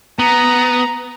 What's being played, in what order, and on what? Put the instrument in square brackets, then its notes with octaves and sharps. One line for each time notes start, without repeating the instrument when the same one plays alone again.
[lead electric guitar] B3 [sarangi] A#5